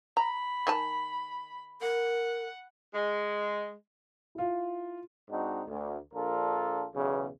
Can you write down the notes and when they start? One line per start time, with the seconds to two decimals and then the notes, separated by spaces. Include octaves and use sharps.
0.17 A#5 B5
0.67 D#3 G#5 A5
1.81 A#4 F#5
2.94 G#3
4.35 E4 F4
5.30 G#2 C4 D4 D#4 F#4
5.67 D2
6.13 A#1 D4 F4 A4 A#4
6.95 B1 E2 C#3